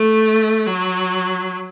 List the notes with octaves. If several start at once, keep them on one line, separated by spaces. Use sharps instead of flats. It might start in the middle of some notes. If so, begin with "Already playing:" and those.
Already playing: A3
F#3